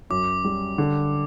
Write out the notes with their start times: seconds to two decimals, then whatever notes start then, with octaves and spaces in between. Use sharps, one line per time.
0.10 F#2 D6
0.44 G3
0.78 D3